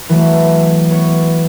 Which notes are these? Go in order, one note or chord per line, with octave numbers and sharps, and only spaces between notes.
E3 F#3 A3
B3 C#5